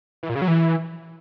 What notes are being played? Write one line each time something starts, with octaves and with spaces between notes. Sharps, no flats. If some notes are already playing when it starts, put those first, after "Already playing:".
E3
A#2
C#3
F#3
E3